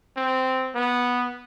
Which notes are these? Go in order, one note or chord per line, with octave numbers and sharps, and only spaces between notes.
C4
B3